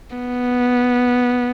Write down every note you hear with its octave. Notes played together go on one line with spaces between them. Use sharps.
B3